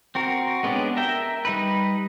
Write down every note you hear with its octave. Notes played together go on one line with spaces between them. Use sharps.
C4 F#4 A#4
G#3 B3 C#4 D4 G4
A#4 E5 G5
G3 D#4 B4